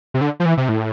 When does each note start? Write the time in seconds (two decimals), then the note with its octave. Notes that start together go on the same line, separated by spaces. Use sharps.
0.14 C3
0.21 D3
0.40 F3
0.46 E3
0.57 C3
0.69 A2